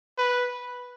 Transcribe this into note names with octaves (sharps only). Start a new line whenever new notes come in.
B4